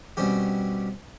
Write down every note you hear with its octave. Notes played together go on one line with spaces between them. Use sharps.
B2 G3 C4 C#4 G4